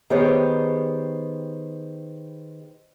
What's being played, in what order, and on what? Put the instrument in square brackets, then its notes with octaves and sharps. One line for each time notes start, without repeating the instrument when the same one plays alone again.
[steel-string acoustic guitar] D#3 B3 G4 G#4 C5 C#5